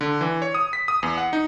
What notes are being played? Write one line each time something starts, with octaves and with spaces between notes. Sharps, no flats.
D3
E3
C#5
D#6
B6
D#6
E2
F#5
D#4